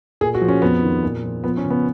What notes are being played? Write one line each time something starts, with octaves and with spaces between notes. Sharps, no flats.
A#2 G#4
F#4
F3
C#4
F2 B3
D#3
A#2
F3
F3 B3
C#4
C#3
B3